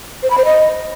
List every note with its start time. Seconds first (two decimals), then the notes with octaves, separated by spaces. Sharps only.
0.23 C5
0.30 B5
0.38 C5
0.45 D#5